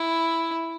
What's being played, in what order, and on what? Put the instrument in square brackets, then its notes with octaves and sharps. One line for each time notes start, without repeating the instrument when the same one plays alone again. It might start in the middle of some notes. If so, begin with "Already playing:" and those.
Already playing: [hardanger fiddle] E4